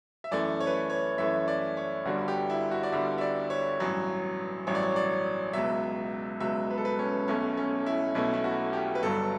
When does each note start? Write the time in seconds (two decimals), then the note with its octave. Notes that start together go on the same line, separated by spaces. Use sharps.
0.24 E5
0.31 F#2 E3 A3 D5
0.60 C#5
0.67 B4
0.74 C#5
0.90 C#5
1.18 F#2 E3 A3 E5
1.48 D5
1.77 C#5
2.05 G1 G2 D3 G3 F#4
2.28 G4
2.50 E4
2.71 F#4
2.83 D5
2.92 G1 G2 D3 G3 E5
3.18 E5
3.21 D5
3.50 C#5
3.80 A1 G2 F#3
4.67 A1 G2 F#3 C#5
4.75 D5
4.83 C#5
4.96 D5
5.53 C#2 B2 F#3 E5
6.40 C#2 B2 F#3 E5
6.70 B4
6.78 A4
6.85 B4
6.99 C#4
7.28 B1 B2 A3 C#4
7.57 C#4
7.86 E4
8.15 B1 B2 A3 E4
8.34 E4
8.44 F#4
8.73 G4
8.95 B4
9.02 G1 G2 F#3 A4